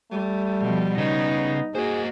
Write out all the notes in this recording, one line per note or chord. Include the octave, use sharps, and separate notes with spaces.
G3 A3
B2 F3
C#3 B3 D#4
A#3 F#4 G#4 C5 D#5